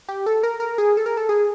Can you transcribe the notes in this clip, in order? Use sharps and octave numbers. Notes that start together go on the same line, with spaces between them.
G4
A4
A#4
A#4
G#4
A4
A#4
A4
G#4